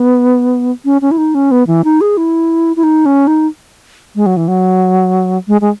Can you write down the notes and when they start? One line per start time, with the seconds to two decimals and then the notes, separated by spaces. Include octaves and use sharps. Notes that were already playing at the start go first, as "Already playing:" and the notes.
Already playing: B3
0.85 C#4
1.02 C#4
1.11 E4
1.18 D#4
1.35 C#4
1.51 B3
1.67 E3
1.84 D#4
2.01 G#4
2.17 E4
2.76 E4
2.83 D#4
3.06 C#4
3.27 D#4
4.16 G#3
4.26 F#3
4.37 E3
4.48 F#3
5.48 G#3
5.61 G#3